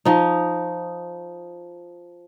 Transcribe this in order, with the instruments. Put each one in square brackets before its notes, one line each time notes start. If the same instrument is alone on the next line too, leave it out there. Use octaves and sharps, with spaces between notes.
[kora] F3 D#4